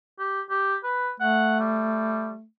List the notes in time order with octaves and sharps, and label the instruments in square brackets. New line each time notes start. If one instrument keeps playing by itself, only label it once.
[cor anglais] G4
G4
B4
[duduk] A3 [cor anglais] F#5
[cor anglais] G3